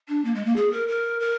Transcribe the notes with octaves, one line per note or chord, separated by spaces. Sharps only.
D4
A#3
G#3
A#3
G#4
A#4
A#4
A#4